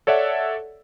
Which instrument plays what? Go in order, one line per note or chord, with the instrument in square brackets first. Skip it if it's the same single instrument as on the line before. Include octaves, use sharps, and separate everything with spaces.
[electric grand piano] A4 C#5 D5 E5 F#5